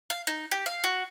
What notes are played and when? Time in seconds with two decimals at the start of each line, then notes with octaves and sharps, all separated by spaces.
0.10 F5
0.27 D#4
0.51 G4
0.66 F5
0.84 F#4